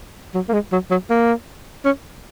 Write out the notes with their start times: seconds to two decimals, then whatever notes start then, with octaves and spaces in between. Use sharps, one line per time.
0.34 F#3
0.49 A#3
0.53 G#3
0.72 F#3
0.90 F#3
1.10 A#3
1.85 C#4